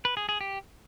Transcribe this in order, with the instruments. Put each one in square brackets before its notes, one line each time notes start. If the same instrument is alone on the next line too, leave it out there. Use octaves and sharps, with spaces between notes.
[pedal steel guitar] B4
G#4
G#4
G4